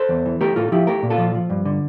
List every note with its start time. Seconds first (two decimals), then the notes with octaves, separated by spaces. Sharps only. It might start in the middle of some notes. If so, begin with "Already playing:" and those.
Already playing: A4 C5
0.09 E2
0.26 E3
0.41 A3 G4 A#4
0.56 A2 F4 A4
0.72 F3 E4 G4
0.87 A3 G4 A#4
1.02 A#2
1.10 F4 A4
1.18 F3
1.35 F3
1.50 G2
1.65 D3